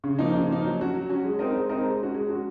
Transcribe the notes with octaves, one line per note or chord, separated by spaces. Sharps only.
C#3
F3 A#3 D#4
C#3
F3 A#3 D#4
F#3
C#4 F#4
F#3
C#4 F#4
G#3
C4 D#4 A#4 D#5
G#3
C4 D#4 A#4 D#5
G#3
C#4 F#4
G#3
C#4 F#4